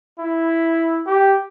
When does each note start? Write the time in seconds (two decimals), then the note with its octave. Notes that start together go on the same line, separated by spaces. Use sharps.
0.19 E4
1.07 G4